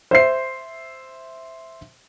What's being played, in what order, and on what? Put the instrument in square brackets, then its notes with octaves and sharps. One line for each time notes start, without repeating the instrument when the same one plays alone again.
[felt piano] C5 E5 C7